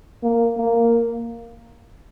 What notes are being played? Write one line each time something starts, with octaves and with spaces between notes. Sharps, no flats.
A#3
A#3